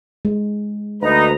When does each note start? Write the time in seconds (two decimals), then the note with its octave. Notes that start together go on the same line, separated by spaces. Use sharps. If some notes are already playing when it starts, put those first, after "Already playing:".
0.25 G#3
1.02 D2 D#4 B4 A#5